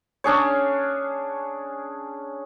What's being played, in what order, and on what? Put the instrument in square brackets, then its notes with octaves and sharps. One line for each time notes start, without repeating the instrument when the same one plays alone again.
[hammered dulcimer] C#4 D4 G#4 C#5